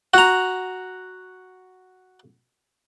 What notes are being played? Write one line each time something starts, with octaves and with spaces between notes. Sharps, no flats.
F#4 A#5